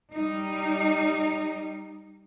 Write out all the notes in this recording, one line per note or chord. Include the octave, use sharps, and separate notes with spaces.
G3 D#4